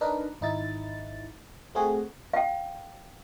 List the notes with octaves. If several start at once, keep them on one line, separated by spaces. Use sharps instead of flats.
D4 D#4 A#4 B4
G#1 D#4 E4 A6
A3 C4 F#4 G#4
F5 G5